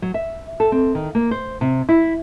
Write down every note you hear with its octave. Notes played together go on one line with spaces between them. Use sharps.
F#3
E5
A4
C4
D#3
A#3
C5
C3
E4